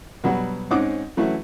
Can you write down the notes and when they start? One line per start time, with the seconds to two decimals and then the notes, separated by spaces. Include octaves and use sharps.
0.24 B2 F#3 G3 B3
0.70 G#2 C4 C#4 D#4 F#5 D6
1.17 E3 F#3 A3 C#4 F#4